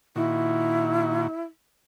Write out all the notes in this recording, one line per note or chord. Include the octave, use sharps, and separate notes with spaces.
A#2 D#3 E4 F#4